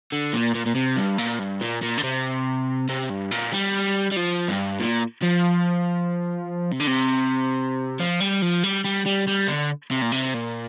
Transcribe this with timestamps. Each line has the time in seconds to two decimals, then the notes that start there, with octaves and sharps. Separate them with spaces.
0.12 D3
0.33 A#2
0.55 A#2
0.66 A#2
0.76 C3
0.97 G2
1.18 A#2
1.40 G2
1.61 A#2
1.82 A#2
1.98 D3
2.03 C3
2.89 C3
3.10 G2
3.31 A#2
3.53 G3
4.11 G3
4.16 F3
4.48 G2
4.80 A#2
5.23 F3
6.72 C3
6.80 D3
6.87 C3
8.00 F3
8.20 G3
8.42 F3
8.64 G3
8.85 G3
9.06 G3
9.27 G3
9.48 D3
9.91 C3
10.02 A#2
10.12 C3
10.34 A#2